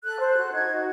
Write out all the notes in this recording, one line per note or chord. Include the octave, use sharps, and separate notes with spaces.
A4 F#6
C5
F#6
F#4
D#4 G#6
F#4